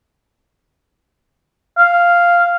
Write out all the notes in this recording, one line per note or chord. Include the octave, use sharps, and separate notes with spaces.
F5